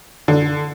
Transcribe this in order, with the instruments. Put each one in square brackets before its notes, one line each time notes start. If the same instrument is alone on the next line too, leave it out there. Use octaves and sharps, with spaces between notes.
[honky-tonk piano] D3